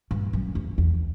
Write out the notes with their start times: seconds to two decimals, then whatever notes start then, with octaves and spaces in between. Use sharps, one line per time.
0.11 G2
0.33 F#2
0.55 E2
0.78 E2